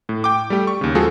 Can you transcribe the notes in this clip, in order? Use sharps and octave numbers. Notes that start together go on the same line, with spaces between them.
A2
G5 D6
G3 A3 G4
C#6
D#2 C#3
F3 G#3 F4 F#4 G#4 A4